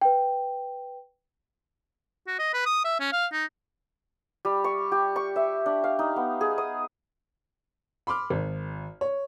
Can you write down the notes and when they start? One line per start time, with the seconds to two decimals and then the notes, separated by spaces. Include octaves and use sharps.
0.01 B4 G5
2.27 F#4
2.39 D#5
2.54 B4
2.66 D#6
2.85 E5
3.00 C#4
3.12 F5
3.32 D#4
4.45 G3
4.64 C#6
4.92 G4
5.16 C#6
5.36 E5
5.66 D4
5.84 F5
5.99 D#4
6.16 B3
6.41 G#4
6.58 D#6
8.07 B5 C6 D6 F6
8.30 G#1
9.01 C#5